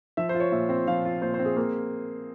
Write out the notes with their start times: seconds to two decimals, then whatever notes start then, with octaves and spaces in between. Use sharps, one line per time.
0.17 F3 E5
0.29 C5
0.34 F4
0.40 C#5
0.52 A#2 E5
0.69 C4
0.87 F3 F5
1.05 F4
1.22 A#2 C5
1.34 C5
1.39 C4
1.45 G#4
1.57 A#3